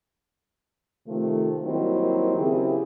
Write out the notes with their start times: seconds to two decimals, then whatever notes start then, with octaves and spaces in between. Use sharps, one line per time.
1.07 C3 D#3 F3 A3
1.64 D#3 F#3 G3 A#3 C4 E4
2.37 C#3 C4 E4 G4 G#4 A#4